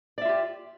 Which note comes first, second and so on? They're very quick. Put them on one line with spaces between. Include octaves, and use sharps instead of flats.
D5 E5 F4 G4